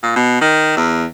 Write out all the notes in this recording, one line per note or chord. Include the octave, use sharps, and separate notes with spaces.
A#2
B2
D#3
E2